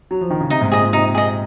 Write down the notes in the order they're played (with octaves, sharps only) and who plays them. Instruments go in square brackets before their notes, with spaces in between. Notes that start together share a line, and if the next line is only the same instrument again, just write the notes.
[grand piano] F#3
F3
D#3
C#3
[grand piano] C3 [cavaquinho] D#4
[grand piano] G#2
[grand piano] A#2 [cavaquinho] G#4 D#5
[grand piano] A#2
[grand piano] C3 [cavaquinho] D#4
[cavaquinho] G#4 D#5